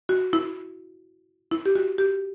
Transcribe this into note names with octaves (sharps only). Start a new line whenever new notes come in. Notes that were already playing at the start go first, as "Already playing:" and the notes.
F#4
E4
E4
G4
F#4
G4